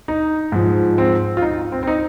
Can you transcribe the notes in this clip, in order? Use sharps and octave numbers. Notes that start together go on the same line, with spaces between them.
D#4
G#2 F3
C4
F4
D#4
C4
C4
D#4